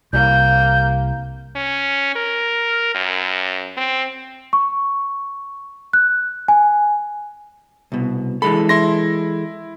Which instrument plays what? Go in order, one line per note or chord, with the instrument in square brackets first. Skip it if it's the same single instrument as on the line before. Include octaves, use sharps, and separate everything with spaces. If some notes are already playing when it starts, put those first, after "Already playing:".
[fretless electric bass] C2 [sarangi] A#3 [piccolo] G6
[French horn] C#4
A#4
F#2
C4
[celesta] C#6
F#6
G#5
[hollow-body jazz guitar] C2 B2
[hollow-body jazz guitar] E3 G#3 A4 [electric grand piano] B5
[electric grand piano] E4 C6 A#6